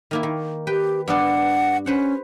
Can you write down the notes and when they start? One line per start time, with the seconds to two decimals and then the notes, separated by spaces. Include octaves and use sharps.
0.11 D#3 A#3 E4
0.23 D#3
0.67 G4 B4 G5
1.08 G2 B3 D4 F#5
1.86 C#4 B4 C5 F#5